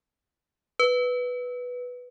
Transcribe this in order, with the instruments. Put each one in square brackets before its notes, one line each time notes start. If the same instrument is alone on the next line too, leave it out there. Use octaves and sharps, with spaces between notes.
[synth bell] B4